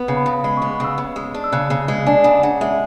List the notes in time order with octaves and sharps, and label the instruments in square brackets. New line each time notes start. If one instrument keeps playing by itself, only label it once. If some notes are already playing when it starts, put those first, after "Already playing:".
Already playing: [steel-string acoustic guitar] B3
C#3
[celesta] B5
[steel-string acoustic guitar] C#3
[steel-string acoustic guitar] G#3 [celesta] B5
[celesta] C#6
[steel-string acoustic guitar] B3
[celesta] C#6
[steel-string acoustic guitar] C#3 [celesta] E6
[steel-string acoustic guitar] C#3
G#3
D4
[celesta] E6
[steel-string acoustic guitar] C#3 [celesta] F#6
[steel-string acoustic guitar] C#3
G#3
[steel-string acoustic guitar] D4 [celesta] G#5
[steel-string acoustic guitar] C#3 [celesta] G#5
[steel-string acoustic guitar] C#3 [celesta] F#5
[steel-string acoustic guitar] G#3 [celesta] E5